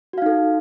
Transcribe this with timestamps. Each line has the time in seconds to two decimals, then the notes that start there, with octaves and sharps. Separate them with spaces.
0.13 F#4
0.18 F5
0.22 D#4
0.26 A4